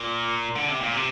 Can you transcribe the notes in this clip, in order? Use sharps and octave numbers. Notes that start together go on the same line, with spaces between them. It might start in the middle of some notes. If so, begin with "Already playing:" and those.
Already playing: A#2
D3
C3
A#2
C3